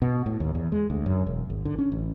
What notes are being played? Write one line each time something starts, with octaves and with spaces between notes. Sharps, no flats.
B2
A2
D#2
E2
G#3
D2
F#2
E1
G#1
D3
C#4
A1